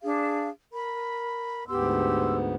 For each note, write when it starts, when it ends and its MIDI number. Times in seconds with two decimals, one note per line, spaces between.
0.02 0.48 62
0.02 0.48 68
0.02 0.48 77
0.72 1.67 70
0.72 1.67 83
1.68 2.55 38
1.68 2.55 44
1.68 2.55 59
1.68 2.36 67
1.68 2.36 84
1.68 2.36 88